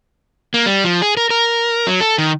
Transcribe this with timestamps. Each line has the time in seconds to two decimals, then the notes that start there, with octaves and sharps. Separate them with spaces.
0.54 A#3
0.66 G3
0.84 F3
1.02 G#4
1.17 A#4
1.30 A#4
1.87 F#3
2.01 A4
2.18 D#3